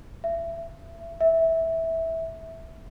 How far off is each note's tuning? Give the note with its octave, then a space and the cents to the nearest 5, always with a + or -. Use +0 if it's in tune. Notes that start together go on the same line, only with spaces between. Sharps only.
E5 +25
E5 -10